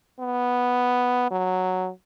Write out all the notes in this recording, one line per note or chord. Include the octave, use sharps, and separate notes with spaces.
B3
F#3